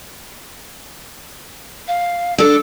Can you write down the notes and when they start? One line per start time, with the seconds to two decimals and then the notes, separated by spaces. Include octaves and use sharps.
1.88 F5
2.38 D4 A4 E6